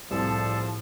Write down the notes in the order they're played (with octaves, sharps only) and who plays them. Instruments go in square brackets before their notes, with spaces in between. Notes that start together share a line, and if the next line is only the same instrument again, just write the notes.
[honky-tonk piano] C2 [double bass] A2 [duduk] F3 [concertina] G#4 A4 A5